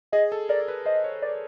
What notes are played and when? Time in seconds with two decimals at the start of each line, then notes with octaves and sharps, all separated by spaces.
0.12 G#4 D#5
0.32 A4
0.49 A#4 D5
0.68 B4
0.86 C5 D#5
1.04 C#5
1.22 B4 D5